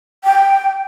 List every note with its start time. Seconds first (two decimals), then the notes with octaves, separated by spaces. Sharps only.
0.24 G5